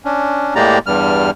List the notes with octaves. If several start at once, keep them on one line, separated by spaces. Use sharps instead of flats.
C#4 D4
A2 G#3 A#3 G4 D5 A#5
E2 G2 G3 F6